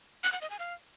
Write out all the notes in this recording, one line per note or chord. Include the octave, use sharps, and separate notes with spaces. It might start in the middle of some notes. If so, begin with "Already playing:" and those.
F#6
F#5
D#5
G#5
F5